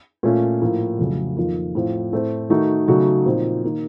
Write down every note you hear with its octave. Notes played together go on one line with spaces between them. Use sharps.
A#2 A3 C#4 F4
A2 F3 A#3 F4
F2 C#3 F#3 A3
F2 D#3 A#3 F4
A2 F3 C4 F4
A2 A3 C4
D#3 A3 D#4 F#4
C#3 F#3 A3 D#4 F#4
A#2 F3 C4 D#4
D#3 A#3 D#4